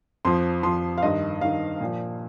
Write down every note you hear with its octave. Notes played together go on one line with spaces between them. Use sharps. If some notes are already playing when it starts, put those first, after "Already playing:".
F2 F3 C6
F2 F3 C6
F5
G2 D#3 D#5
G2 D#3 F5
A#2 F3